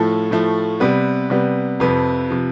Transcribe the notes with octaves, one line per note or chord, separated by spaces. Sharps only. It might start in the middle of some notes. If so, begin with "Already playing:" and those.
Already playing: A2 F3 A3 A4
A2 F3 A3
C3 G3 B3 B4
C3 G3 B3
F2 C3 F3 B4
C3 F3